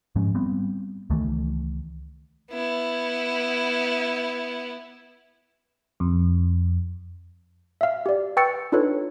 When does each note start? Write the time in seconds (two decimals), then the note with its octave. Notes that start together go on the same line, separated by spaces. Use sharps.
0.16 G#2 F3 G#3 C#4
0.35 G3 B3 C4
1.10 C#2 D#3 E3 A3
2.51 B3 E4
6.00 F2
7.81 E5 F5
8.06 G4 D5
8.37 B4 G5 C#6 E6 A6 C#7
8.72 D4 D#4 F4 A4 B4 C#5